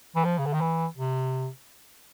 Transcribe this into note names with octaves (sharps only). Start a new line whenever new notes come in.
E3
F3
C#3
D3
D#3
E3
C3